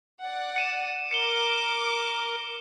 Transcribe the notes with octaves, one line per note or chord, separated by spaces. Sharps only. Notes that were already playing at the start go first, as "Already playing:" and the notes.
D5 F#5
C#7 D#7 E7
A#4 D6 C#7 E7 G7